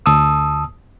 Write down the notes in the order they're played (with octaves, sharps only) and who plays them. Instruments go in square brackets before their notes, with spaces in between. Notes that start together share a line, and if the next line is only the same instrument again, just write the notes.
[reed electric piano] D2 A5 D#6 E6